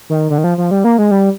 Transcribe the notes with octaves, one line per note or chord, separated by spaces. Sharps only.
D#3
D3
D#3
F3
F3
G3
A#3
G#3
G3